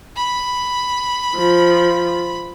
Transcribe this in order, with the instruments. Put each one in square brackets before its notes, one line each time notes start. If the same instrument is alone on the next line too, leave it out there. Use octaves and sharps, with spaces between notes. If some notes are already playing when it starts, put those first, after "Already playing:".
[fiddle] B5
[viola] F3